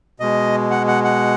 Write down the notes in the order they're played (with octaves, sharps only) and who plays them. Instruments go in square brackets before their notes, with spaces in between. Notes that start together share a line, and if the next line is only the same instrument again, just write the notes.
[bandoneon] B2 G#3 D#5
F#5
F#5
F#5